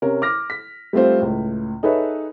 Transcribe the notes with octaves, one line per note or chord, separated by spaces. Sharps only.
C3 C#4 A#4
D6 F6 A#6
B6
G3 A3 C4 F4 C5
C#2 A2
D#4 G#4 A4 B4 C#5 E5